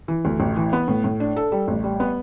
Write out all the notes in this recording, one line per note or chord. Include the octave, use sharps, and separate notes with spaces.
E3
D2
A1
E3
B3
A2
A2
D4
A4
G3
A1
G3
B3